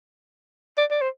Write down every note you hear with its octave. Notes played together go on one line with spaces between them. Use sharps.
D5
D5
C5